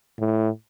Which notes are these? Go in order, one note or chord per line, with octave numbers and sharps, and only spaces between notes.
A2